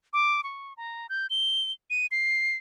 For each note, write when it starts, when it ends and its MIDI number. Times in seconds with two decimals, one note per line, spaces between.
0.13 0.43 86
0.44 0.73 85
0.77 1.07 82
1.09 1.27 91
1.30 1.72 103
1.90 2.06 99
2.12 2.56 96